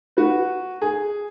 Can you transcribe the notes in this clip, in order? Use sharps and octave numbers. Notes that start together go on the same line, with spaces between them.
F#4 B4
G#4